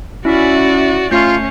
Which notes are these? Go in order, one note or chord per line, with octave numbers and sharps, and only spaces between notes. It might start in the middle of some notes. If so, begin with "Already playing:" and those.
C#4 E4 F#4 D5 E5
A3 C#4 F4 G6 C7